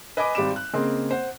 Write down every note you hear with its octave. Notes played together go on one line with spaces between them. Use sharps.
B4 D#5 G#5 B5 D6 F#6
G#1 G3 D5 B5 D6 E7
F#6
C#3 A#3 C4 G#4 D#5 C6
C5 F#5